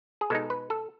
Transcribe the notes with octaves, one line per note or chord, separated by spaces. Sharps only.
G#4
B2 G#3 D#4 A4
B4
A4